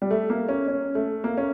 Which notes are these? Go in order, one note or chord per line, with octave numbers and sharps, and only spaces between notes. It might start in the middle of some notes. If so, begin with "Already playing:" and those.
G3
A3
A#3
C#4
C#4
A3
A#3
C#4